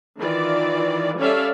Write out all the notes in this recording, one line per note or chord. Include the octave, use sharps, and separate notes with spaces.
D#3 E3 F4 D5
G3 C#4 A4 D5 E5 F5